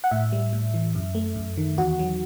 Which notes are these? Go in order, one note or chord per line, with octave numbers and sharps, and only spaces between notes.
F#5
A2 E5
G3
A2
E3
F#2
A3
F#2
D#3
E2 F#4
F#3